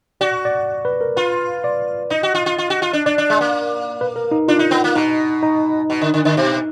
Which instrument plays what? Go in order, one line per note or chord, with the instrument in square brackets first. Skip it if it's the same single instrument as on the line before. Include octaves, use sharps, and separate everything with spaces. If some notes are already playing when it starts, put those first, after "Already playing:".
[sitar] F#4 [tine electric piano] D5
[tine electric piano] D5
B4
A#4
[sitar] F4 [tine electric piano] B4
[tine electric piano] D5
[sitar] D#4 [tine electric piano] D#5
[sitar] F#4
F4
F4
F4
F#4
F4
D4
[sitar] D4 [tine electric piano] D5
[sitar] D4
G#3
A#3
[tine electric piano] B4
A#4
D#4
[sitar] D4 [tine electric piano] F4
[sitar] D#4
B3
A#3
[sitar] B2 [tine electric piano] D#4
[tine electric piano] D#4
[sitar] B2
D3
D3
D3
B2